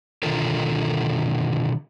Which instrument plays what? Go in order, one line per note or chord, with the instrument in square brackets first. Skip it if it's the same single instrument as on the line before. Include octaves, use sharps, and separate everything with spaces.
[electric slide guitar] B2 D3 D#3 F4 A4 A#4